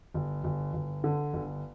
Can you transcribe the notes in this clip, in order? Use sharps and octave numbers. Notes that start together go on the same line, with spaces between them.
G1
G1
G1
D3
G1